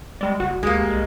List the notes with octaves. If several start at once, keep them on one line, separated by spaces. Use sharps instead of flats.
G3 G#3 D5
F#1 F#4
D2 G#3 A#3 G4 D#5
C2